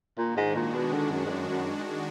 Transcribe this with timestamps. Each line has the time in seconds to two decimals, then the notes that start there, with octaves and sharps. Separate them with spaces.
0.18 A#2 D#3 G#3 D4 F#4
0.37 G#2
0.55 A#2
0.74 B2
0.93 D3
1.11 F#2
1.25 G#2
1.30 F#2
1.49 F#2